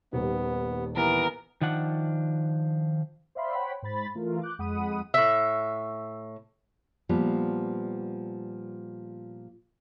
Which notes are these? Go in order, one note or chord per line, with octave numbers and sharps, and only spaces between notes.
D#1 D#2 B3
E3 B3 A#4
D#3 F3 D4 F#5
C5 D5 E5 F5 B5 C6
C5 C#5 F#5 G5 B5
G#2 C5 B5 A6
E3 A3 F4 A#4
D6 F#6 G6
F2 G#3 F#5 B5 D#6 D#7
A2 E5
A#2 F3 G3 B3